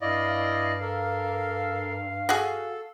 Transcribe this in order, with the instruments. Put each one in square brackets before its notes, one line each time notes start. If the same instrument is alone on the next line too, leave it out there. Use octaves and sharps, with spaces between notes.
[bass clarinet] G2 [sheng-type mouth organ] E4 D5 D#5 [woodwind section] F5
[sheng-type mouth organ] A4 A#4
[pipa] F#4 G#4 [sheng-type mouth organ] A4